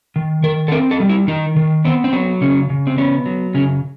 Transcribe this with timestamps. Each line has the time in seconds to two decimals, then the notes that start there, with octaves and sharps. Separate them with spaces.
0.16 D#3
0.43 D#3 A#4
0.68 A4
0.72 C4 A#4
0.91 A4
1.00 G3
1.09 E4
1.28 D#3 D#4
1.56 D#3
1.84 B3 C4
2.04 C4
2.13 F#3
2.41 C#3 C#4
2.70 C#3
2.87 C4
2.98 B3 C#4
3.26 F#3
3.54 C#3 C#4